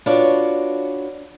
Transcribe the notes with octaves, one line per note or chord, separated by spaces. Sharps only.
D4 F4 F#4 B4 C#5 D5